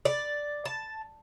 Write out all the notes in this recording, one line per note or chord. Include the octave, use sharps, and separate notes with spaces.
D5
A5